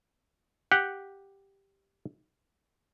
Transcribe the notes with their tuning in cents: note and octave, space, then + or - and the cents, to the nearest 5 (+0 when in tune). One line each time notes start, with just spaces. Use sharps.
G4 +0 F#5 +0